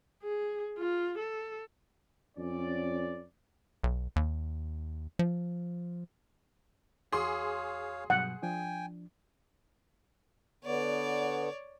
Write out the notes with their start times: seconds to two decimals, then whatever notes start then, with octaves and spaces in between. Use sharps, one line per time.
0.23 G#4
0.78 F4
1.18 A4
2.37 F2 C#4 D5
3.84 B1
4.16 D#2
5.19 F3
7.12 E2 F#4 G#4 C#5 F5 C6 D6
8.10 G2 B2 F#3 F#5
8.43 F3 D4 G5 G#5
10.65 D3 B3 C#5 D5